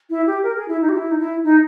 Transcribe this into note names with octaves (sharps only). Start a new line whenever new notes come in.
E4
G4
A#4
G#4
E4
D#4
G4
E4
D#4
E4
D#4